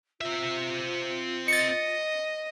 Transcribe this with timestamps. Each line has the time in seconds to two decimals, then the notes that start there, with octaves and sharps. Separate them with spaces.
0.21 C4 F4 E5
1.48 D#5 A6 C#7